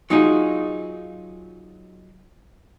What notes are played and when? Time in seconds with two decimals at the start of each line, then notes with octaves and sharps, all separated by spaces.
0.10 F#3 D#4 F4 G#4